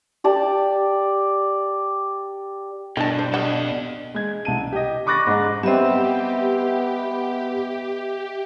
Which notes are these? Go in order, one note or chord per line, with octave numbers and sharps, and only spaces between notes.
G4 D5 A5
G2 B2 D#3 E3 D4 A5
C5
G3 A4 D#5 F#5
G#3 G#6
C2 A5 D#7
G4 D#5
B5 C#6 D6 F#6 A6 A#6
G#2 G#3 D#4
G3 B3 C4 G4 D#5 E5